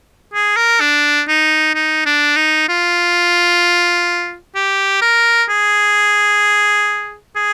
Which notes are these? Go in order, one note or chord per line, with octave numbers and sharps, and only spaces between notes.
G#4
A#4
D4
D#4
D#4
D4
D#4
F4
G4
A#4
G#4
G#4